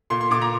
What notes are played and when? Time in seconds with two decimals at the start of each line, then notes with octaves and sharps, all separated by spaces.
0.10 A#2 C6
0.21 C6
0.31 A#2 D6
0.42 A#5